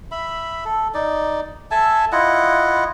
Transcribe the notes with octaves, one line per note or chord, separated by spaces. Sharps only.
E5 B5
A4
D#4 D5
A4 E5 G#5 A5
E4 F4 D#5 F#5